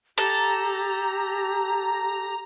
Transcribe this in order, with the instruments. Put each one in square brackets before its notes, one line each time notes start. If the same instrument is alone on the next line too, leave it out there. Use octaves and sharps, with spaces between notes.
[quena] G4 [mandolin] A4 [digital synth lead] A#5